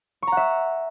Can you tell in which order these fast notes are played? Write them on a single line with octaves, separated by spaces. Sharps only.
C#6 A#5 F#5 E5